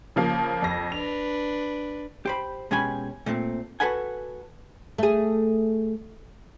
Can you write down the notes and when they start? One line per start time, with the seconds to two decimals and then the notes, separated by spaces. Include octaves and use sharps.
0.16 C#3 F3 A#3
0.62 F2 A#6
0.92 D4 B4 F7
2.26 G4 C5 B5
2.71 B2 G#3 C#4 G4 G#5 B5
3.26 A#2 A3 C4
3.80 F#4 G4 A4 B4 F#5 G#5
4.98 A3 G#4